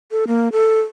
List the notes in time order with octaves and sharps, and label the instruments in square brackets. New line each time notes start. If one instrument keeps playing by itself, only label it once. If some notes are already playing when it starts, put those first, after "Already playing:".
[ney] A4
A#3
A4